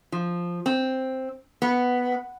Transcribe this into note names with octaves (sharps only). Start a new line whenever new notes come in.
F3
C4
B3